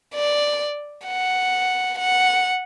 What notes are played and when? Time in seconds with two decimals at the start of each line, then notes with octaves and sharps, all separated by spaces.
0.15 D5
1.06 F#5
1.99 F#5